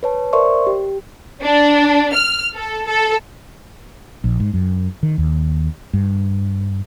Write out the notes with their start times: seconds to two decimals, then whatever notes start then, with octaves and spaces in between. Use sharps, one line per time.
0.03 B4 C#5 A5
0.33 A#4 C5 D5 E5 C6 C#6
0.67 G4
1.42 D4
2.14 F6
2.54 A4
2.86 A4
4.24 A#1
4.40 G#2
4.54 F#2
5.03 D#3
5.18 D#2
5.93 G2